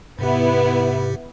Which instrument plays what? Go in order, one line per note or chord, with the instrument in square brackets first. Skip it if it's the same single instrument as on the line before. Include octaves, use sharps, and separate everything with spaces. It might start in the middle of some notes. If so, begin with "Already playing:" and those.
[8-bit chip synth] G#2 C3 G4 [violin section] B3 E4